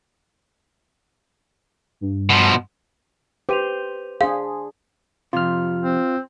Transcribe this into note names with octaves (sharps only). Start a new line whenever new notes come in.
G2
B2 F3
G4 B4 C5 D#7 F7
D4 G#4 C5 F5 C6
F2 C3 F4 F6
C4